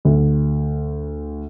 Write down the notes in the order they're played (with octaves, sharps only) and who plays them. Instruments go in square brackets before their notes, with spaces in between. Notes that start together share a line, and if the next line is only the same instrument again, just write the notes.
[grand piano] D2